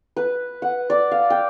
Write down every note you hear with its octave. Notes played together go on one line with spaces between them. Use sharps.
B4
F#5
D5
F5
G5